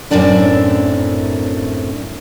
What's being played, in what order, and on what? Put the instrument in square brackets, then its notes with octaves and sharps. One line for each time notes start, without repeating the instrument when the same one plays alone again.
[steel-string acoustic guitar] F#2 A2 C4 D4 E4